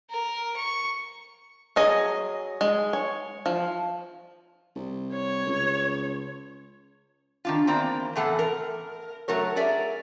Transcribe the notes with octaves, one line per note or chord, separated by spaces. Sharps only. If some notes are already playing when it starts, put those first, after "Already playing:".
A#4
C#6
F#3 G#4 D#5
G#3
C#5
F3
C2
C#5
C#2
D#3 D4 F4
E2 A#3 C4 D5 A#5
E2 A2 E3 A4 F#5 A5
A#4
F#3 A3 A#4 C#5
G#4 A#4 D5 E5